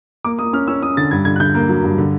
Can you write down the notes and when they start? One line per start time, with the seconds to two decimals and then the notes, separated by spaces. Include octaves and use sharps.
0.24 A#3 D6
0.39 A#3 D#6
0.53 C#4 F6
0.67 C#4 E6
0.82 C#4 D#6
0.97 D3 A6
1.11 G2 G#6
1.25 D3 G#6
1.36 F#6
1.40 D3 G6
1.55 A#3
1.69 F#3
1.84 G2
1.98 D3